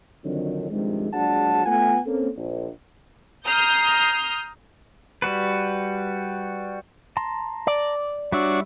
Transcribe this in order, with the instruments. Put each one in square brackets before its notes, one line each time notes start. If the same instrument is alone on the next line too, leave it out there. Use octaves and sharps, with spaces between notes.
[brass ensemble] F2 D3 D#3 F#3
G2 C3 D#3 F3 G#3
A#1 F#3 G#3 D4 F#5 A5
A3 B3 F4 B4 F#5 G#5
A#3 C4 C#4 A4
A#1
[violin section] A#5 D#6 F6 G6 C7
[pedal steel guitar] G3 F#4 B4
A5 A#5 C6
[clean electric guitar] D5
[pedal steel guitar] G3 E5 E6 [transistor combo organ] D4 F#4 C#5